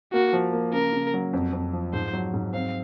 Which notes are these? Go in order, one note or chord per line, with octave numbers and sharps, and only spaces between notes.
A#3 F#4
F3
A#3
C#3 A#4
C#3
F#3
F2
F2
F3
G#2 C5
F#3
G#2
C4 F5